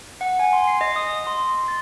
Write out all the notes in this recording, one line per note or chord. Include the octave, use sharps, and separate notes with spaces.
F#5
G#5
C6
C7
D#5
D#6
C6
A6